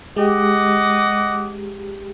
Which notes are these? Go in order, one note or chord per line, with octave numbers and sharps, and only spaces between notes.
G#3 G4 D#5 F#5 D6